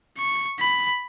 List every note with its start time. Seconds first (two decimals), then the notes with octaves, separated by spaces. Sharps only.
0.18 C#6
0.60 B5